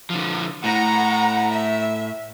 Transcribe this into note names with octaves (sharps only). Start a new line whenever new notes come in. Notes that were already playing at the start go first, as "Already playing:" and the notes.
D3 F3
A2 F#5 A#5
E5